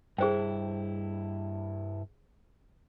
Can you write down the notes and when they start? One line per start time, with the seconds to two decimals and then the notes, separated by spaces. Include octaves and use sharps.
0.18 G2 E4 G#4 C5 G5